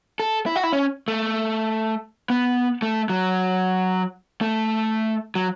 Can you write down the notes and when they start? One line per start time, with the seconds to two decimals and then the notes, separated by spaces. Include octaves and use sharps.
0.20 A4
0.46 E4
0.56 F#4
0.63 E4
0.73 C#4
1.08 A3
2.30 B3
2.82 A3
3.09 F#3
4.41 A3
5.35 F#3